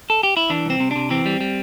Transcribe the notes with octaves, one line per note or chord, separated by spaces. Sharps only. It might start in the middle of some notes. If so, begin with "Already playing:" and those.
A4
G4
E4
E3 D4
C2 C4
C3
C3 D4
E3 C4
G3
G3